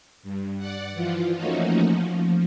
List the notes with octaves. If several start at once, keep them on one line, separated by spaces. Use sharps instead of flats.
G2
D5 F#5
E3 F3 F4
F3 A3 A#3 C#4 D#4 F#4
F3